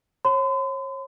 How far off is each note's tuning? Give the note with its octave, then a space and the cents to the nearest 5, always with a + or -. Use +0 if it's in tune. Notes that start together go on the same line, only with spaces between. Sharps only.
C#5 -35 C6 -45